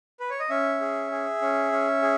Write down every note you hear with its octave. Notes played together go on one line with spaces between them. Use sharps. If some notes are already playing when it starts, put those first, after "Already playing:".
B4
C#5
D#5
C#4 E5
G#4
G#4
C#4
C#4
G#4